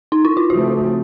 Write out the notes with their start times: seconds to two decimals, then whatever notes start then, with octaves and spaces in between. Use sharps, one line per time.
0.12 D#4
0.25 E4
0.37 F4
0.50 C#3 F3 A3 C4 F#4